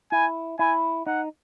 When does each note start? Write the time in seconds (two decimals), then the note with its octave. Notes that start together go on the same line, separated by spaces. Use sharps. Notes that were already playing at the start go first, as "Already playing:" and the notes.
0.12 E4 G#5
0.59 E4 G#5
1.06 D#4 F#5